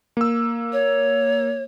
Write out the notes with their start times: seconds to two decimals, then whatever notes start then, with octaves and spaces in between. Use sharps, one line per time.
0.17 A#3 E6
0.73 C#5